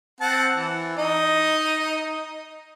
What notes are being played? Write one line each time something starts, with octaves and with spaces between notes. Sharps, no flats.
C4 F#5 A5
E3
D#4 D#5